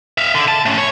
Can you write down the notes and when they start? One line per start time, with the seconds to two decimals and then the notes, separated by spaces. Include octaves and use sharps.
0.18 E5 F5
0.34 D3
0.48 A5
0.66 A3 C#4
0.78 C#5